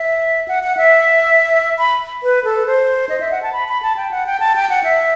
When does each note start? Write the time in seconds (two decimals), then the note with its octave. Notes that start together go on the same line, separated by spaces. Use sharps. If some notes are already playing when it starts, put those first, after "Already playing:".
Already playing: E5
0.48 F#5
0.63 F#5
0.77 E5
1.79 B5
2.23 B4
2.44 A4
2.66 C5
3.09 D#5
3.20 E5
3.31 F#5
3.43 A5
3.53 B5
3.68 B5
3.82 A5
3.97 G5
4.11 F#5
4.26 G5
4.40 A5
4.56 G5
4.70 F#5
4.84 E5